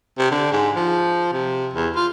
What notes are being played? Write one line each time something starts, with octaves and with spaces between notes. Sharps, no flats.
C3
D3
G#2
F3
C3
E2
F4